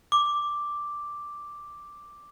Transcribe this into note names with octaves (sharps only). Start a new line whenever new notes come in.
D6